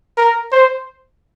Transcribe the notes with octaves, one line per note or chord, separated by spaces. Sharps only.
A#4
C5